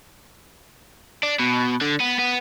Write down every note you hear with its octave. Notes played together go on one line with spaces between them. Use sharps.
D4
B2
D3
B3
B3